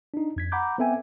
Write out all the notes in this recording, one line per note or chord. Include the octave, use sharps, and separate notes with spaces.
D4 D#4
F2 G#6 B6
F#5 A#5 B5 D6 G6
B3 C4 A4 E5 G5 G#5